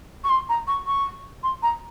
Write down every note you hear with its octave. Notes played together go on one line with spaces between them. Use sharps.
C#6
C6
A#5
C#6
C#6
C6
A#5